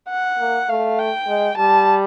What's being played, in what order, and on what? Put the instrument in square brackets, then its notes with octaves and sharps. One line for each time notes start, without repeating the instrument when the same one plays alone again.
[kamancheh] F#5
[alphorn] A#3
[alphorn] A3 [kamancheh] F5
[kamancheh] G5
[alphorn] G#3
[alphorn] G3 [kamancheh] A5